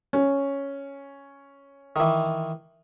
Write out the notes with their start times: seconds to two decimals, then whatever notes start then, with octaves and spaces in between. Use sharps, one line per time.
0.13 C#4
1.96 D#3 E3